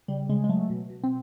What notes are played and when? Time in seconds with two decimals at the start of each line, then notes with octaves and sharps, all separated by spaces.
0.08 C#3 G3
0.29 C#3 G#3
0.44 G#3
0.49 F#3 A3
0.70 B2
0.90 B2
1.04 C4